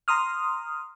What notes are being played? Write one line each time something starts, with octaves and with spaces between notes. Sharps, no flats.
A#5 C6 D#6 F6